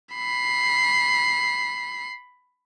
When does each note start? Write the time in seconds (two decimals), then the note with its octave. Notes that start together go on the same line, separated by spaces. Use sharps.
0.14 B5 C7